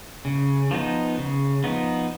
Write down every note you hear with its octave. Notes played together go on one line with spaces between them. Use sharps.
C#3
F3 B3 D#4
C#3
F3 B3 D#4